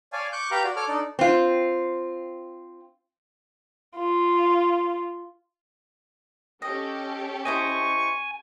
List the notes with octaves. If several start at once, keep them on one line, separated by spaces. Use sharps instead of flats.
C#5 D5 F5 G#5 A5
C#6 D6 F#6 G6
G4 B4 F5 A#5 G6
F#4 D5
A4 C#5 D6 F6
D4 D#4 A4 D5
C4 F4
F4
C#4 G4 A4 D#5
E4 C5 D#5 G#5 C#6